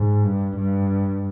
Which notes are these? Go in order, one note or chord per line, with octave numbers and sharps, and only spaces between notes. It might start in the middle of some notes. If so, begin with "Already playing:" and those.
Already playing: G#2
G2
G2